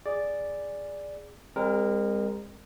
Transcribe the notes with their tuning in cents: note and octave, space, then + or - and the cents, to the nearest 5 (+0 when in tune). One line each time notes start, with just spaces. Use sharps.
G#4 -10 D5 +0
G#3 -40 C4 +0 A#4 +0